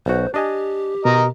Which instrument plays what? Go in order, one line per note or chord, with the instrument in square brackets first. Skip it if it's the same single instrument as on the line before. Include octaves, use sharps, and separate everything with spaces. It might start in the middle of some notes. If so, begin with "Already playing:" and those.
[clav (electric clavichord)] B1 F#4 [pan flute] C5
[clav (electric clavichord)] D4 D#5 G#5 [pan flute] G4
[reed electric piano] B2 [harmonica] A#4 D#5